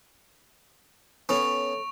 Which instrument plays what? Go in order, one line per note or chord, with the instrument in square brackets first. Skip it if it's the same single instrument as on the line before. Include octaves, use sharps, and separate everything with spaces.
[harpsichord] B3 C#4 [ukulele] A4 C#5 [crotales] C#6 F7